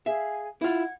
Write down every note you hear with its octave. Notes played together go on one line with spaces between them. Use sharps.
G#4 E5 F5 G#5
E4 F4 F#5 G#6